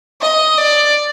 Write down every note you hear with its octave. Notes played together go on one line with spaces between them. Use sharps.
D#5
D5